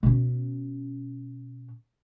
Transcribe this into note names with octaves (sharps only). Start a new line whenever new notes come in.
B2 C#4